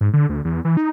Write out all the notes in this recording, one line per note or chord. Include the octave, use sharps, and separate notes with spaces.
G#2
D3
D2
E2
E3
D#4